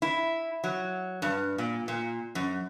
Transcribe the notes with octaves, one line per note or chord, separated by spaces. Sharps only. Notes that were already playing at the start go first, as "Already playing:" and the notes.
E4
F#3
G2
A#2
A#2
F#2